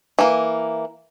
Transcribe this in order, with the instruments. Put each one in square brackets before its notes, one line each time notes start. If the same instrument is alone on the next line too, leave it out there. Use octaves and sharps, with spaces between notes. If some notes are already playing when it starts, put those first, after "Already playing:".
[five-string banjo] E3 A#3